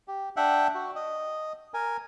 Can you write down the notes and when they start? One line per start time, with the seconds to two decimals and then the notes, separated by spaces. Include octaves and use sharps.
0.08 G4
0.37 D4 E5 F#5 G5
0.75 F#4
0.96 D#5
1.74 A#4 G#5